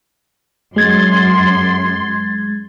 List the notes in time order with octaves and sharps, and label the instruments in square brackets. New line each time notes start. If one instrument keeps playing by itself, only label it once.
[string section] F#2 C6 [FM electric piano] G#3 G#6 A6